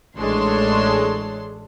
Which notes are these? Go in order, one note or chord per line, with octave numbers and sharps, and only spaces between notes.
A1 G#3 D4 A4 C#5 C6